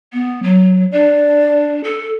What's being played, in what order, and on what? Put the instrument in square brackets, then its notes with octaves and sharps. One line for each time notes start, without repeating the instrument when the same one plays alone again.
[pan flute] B3
F#3
[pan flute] D4 [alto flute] D5
[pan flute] A4